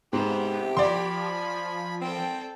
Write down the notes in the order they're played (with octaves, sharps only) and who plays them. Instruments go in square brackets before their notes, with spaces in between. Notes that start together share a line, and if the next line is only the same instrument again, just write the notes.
[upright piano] G#2 [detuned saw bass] C3 [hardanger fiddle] B3 C5 [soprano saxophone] G4
[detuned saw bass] F3 [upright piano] D5 C6 [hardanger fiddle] G#5 B5
[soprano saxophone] C4 [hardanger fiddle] A4 G5